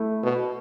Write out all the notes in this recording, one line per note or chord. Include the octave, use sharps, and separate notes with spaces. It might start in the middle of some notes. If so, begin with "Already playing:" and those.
Already playing: A3 E4
B2